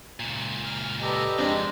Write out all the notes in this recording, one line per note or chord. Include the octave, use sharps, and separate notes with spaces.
C#2 A#2
F6
G4 A4 B4 D5 D#5 A#5
F2 G#3 C4 D4